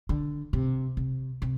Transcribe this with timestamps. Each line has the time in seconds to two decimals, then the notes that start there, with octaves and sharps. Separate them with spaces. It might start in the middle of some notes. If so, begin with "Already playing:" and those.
0.09 D3
0.53 C3
0.97 C3
1.42 C3